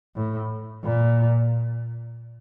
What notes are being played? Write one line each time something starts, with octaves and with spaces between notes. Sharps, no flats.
A2
A#2